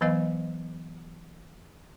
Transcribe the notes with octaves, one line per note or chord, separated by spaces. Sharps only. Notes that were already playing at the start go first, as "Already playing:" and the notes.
E3 F#3 B3 B4 D#5 F5